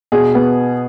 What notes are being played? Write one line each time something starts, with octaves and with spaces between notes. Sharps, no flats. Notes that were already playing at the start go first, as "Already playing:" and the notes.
B2 G#4
B3